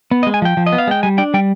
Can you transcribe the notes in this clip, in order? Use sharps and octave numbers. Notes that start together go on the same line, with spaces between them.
B3
D#5
G#3
G#5
F3 G5
F3
D#5
B3
F5
G#3 G5
G3 G#5
D4 G5
G3 G5